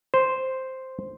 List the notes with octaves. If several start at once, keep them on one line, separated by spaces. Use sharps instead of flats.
C5